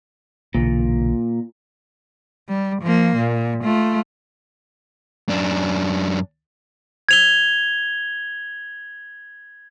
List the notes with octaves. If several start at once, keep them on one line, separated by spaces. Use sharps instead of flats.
B1 A#2 D3 E3
G3
F3 A#3
A#2
A3 F4
F#2 D4
G#6 F7 G7